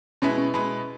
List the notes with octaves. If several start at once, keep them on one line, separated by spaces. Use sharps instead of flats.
B2 G#3 B3 C#4 E4 B4
C#4
B2 G#3 B3 E4 B4